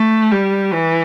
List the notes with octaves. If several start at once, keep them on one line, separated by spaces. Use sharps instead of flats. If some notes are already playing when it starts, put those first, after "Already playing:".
Already playing: A3
G3
E3